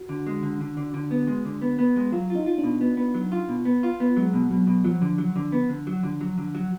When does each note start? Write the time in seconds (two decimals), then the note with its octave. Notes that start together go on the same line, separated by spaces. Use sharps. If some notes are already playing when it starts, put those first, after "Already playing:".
Already playing: F#4
0.09 D3
0.27 G#3
0.43 D3
0.60 D3
0.77 D3
0.94 D3
1.11 B3
1.27 G#3
1.45 D3
1.62 B3
1.79 B3
1.96 G#3
2.12 F#3 F4
2.30 D#4 F4
2.46 F4
2.58 D4
2.63 B2
2.81 B3
2.97 B3
3.14 F#3
3.32 F4
3.48 B2
3.65 B3
3.83 F4
4.00 B3
4.17 F#3 G#3
4.33 B2
4.50 B2 F#3
4.67 B2
4.84 F3 F#3
5.02 D3
5.18 F#3
5.36 D3
5.52 B3
5.69 D3
5.87 F#3
6.03 D3
6.21 F#3
6.38 D3
6.55 F#3